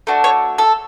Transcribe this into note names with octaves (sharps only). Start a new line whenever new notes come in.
A3 D4 F#4
C#5
A4